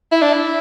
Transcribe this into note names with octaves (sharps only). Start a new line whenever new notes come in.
E4
D4
E4